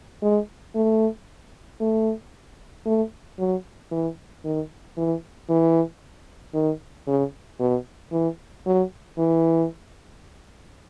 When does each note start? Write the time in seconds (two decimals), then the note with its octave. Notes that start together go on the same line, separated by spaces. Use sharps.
0.22 G#3
0.75 A3
1.81 A3
2.86 A3
3.39 F#3
3.91 E3
4.45 D#3
4.97 E3
5.49 E3
6.54 D#3
7.07 C#3
7.60 B2
8.12 E3
8.66 F#3
9.18 E3